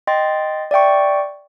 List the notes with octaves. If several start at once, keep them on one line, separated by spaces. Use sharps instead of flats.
D#5 G5 C6 A6
D5 E5 G5 C#6